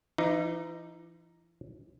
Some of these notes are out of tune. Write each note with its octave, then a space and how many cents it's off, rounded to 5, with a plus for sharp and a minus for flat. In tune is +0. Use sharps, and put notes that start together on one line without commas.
E3 +40 D#4 +0